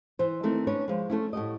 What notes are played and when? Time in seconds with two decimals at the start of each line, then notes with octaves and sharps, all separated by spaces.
0.19 E3 C5
0.43 D#3 E3 A3 C4 D#4
0.67 C#4 D4 B4 C#5
0.88 F3 G#3
1.10 A3 C#4 E4
1.33 A2 F#4 G4 D#5